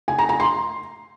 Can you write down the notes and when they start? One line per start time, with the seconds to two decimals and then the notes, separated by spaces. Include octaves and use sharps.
0.08 G#5
0.19 A#5
0.29 A#5
0.40 C6